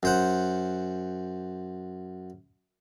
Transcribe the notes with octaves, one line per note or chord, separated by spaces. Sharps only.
F#2 C5 F#5